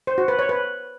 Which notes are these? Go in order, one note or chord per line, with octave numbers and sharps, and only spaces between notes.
C5
F#4
B4
C#5
B4